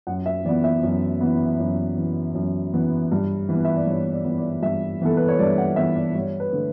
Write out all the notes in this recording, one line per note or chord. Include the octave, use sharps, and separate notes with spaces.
F#2 F#5
E5
E3 B3 D5
E5
F#2
E3 B3
F#2
E3 B3
F#2
E3 B3
G2
E3
B3
E5
D5
G2 C#5
D5
E3 B3
D5
G2 E5
E3 B3 A4
B4
C#5
G2 D5
F#5
E3 B3 E5
D5
G2 C#5
B4
D3 A3